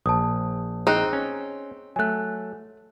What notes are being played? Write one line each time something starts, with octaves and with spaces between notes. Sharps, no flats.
A#1 A5 D#6
C4 D#4 G#4 F#6
C#4
F#3 A3 G#5 F#6